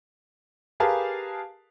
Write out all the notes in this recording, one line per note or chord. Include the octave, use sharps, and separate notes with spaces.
G4 G#4 A#4 B4 F5 A5